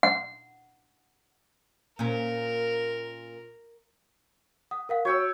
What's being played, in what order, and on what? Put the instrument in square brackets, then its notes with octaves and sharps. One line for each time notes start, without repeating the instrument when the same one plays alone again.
[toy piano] F#5
[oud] A#2 C#4 [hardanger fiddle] A#4
[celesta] F#5 D#6
A#4 F5 F#5
[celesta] F#4 [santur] C#5 G5 E6